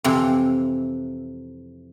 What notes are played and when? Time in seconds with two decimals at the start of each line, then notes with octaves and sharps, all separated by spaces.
0.04 F2 C3 E3